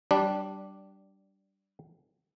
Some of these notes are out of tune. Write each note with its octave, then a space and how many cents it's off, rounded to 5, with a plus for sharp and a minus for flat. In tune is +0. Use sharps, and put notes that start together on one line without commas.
G3 -20 D4 +0